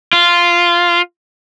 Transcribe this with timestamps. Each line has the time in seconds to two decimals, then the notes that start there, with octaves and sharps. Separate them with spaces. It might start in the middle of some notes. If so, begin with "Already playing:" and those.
0.13 F4